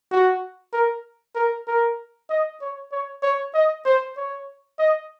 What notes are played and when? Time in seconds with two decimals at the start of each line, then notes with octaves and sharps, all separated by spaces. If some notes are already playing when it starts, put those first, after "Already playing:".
0.11 F#4
0.73 A#4
1.35 A#4
1.67 A#4
2.30 D#5
2.61 C#5
2.92 C#5
3.23 C#5
3.54 D#5
3.86 C5
4.17 C#5
4.79 D#5